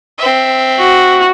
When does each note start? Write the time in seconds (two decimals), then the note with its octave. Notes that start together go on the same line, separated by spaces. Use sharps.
0.18 C4 E5
0.78 F#4